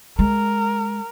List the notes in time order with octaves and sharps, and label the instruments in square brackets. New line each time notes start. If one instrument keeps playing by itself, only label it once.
[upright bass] G#3 [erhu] A#4